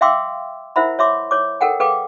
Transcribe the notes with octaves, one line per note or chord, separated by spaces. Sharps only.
E5 F5 G5 C6 D6 E6
E4 A#4 C5 E5 F#5 B5
C#5 E5 C6 D6
C#5 D6
A4 A#4 F#5 G5
G#4 A4 B4 F5 G5 D6